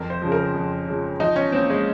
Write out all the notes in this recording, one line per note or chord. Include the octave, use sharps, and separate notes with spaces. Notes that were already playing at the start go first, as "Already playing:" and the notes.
Already playing: F2 A#4
C5
C#3 F3
A#4
F2
C#3 F3
F3 D#4
C#4
A#3 C4 C#4 F4
G#3